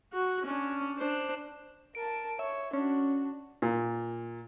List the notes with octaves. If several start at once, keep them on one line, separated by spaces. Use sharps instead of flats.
F#4
C#4 D4
D4 C5
A#4 A5 D7
C#5 E5
C#4 D4 F#4
A#2